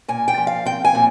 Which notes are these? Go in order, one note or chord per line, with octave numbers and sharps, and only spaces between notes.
A#2 G#5
G5
F3
F5
C4 G5
G#5
A#2